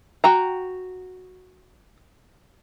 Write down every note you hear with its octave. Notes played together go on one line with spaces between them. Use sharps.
F#4 G5 A#5